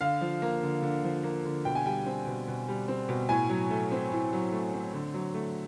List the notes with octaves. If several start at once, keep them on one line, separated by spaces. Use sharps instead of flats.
D3 F5
F3
A#3
D3
D3
F3
A#3
D3
B2 G5
G#5
G3 G5
C4
B2
B2
G3
C4
B2
A2 G#5
F#3
A3
C4
A2
F#3
A3
C4
D3
F#3
A3